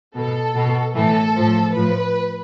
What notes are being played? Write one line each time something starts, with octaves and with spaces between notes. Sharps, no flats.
B2 A4
B2
A2 E3 A4
A2 F3
A2 F3 B4